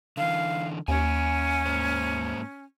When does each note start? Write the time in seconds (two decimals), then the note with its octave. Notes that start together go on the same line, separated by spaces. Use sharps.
0.17 D3 E3 F5
0.88 D#2 C#4 E5 F#5 G#5
1.66 G#2 A#3 C5